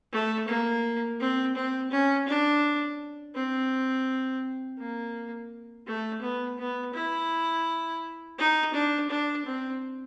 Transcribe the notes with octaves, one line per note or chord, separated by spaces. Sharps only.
A3
A#3
C4
C4
C#4
D4
C4
A#3
A3
B3
B3
E4
D#4
D4
D4
C4